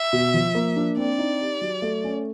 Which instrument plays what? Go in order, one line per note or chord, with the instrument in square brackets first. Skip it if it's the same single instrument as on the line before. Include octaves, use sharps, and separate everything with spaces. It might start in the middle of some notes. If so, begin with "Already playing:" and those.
Already playing: [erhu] E5
[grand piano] B2
F3
A#3
D4
[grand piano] C4 [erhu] D5
[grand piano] D#4
G4
F#3
A3
C#4